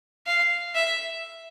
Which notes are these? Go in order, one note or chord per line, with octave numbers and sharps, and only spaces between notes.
F5
E5